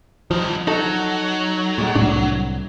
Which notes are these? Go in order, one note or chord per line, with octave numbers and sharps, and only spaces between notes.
G2 F3 D#4
F#3 D#4 A4
A#2 G#3
C2 A2 D4